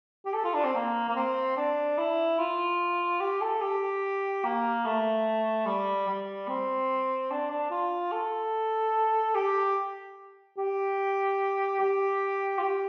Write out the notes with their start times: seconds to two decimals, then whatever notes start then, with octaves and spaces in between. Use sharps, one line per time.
0.26 G4
0.34 A4
0.45 F4
0.54 D4
0.65 C4
0.75 A#3
1.08 A#3
1.16 C4
1.57 D4
1.98 E4
2.39 F4
3.21 G4
3.41 A4
3.62 G4
4.44 A#3
4.85 A3
5.66 G3
6.08 G3
6.48 C4
7.31 D4
7.51 D4
7.71 F4
8.12 A4
9.35 G4
10.58 G4
11.80 G4
12.59 F4
12.62 G4